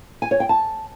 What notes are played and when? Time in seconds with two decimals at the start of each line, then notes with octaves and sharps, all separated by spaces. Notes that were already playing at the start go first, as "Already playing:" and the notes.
0.22 G#5
0.31 C#5
0.40 G5
0.49 A5